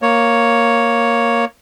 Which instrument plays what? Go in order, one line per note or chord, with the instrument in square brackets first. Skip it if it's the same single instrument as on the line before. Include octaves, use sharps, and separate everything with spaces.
[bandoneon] A#3 C#5